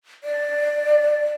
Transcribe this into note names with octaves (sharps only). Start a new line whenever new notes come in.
D5